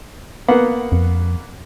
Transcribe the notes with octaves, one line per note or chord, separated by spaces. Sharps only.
A#3 B3 F#5
F2